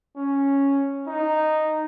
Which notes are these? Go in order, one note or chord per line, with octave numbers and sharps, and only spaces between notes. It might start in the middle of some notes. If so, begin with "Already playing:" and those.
C#4
D#4